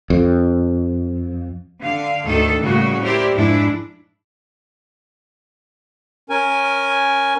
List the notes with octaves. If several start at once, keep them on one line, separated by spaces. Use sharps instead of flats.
F2
D3 F5
D2 G#2 D#3 A4
A2 C#3 G3 A#3 C#4 F#4
E4 G4 A#4 C5 D5
F2 G#2 D4 E4
C#4 A#4 G#5